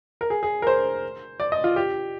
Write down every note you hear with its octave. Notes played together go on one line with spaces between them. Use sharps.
A#4
G#4
G#4
A#4
C5
D5
D#5
F4
G4